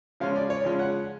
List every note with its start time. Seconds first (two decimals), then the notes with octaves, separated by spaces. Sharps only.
0.20 C#3 F3 G#3 C#4 F4 F5
0.36 D5
0.50 C#5
0.64 C#3 F3 G#3 C#4 F4
0.79 F#5